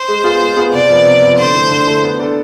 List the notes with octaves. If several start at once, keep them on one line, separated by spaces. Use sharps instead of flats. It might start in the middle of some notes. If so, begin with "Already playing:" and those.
Already playing: C5
G#3
B3 F4 G#4
G#3
B3 F4 G#4
C3 D5
F3 B3
C3
F3 B3
D3 C5
A3 E4
D3
A3 E4
B3
D4 A4